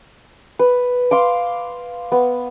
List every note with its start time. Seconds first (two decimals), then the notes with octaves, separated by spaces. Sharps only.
0.59 B4
1.11 F5 C6 D6
2.12 B3